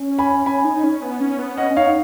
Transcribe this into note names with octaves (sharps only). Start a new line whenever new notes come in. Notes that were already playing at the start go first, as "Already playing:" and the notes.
Already playing: C#4
G#5 B5
C#4 G#5 B5
D#4
C#4
B3
C#4
B3
C#4 D#5 F#5
C#4
D#4 C#5 F5